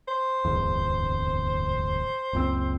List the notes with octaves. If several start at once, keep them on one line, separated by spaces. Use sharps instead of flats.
C5
D1 G1 E2
F#1 C#2 C4